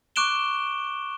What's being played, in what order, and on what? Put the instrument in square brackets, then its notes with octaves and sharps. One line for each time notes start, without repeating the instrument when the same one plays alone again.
[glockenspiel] C#6 D6 F#6 D7 E7 G7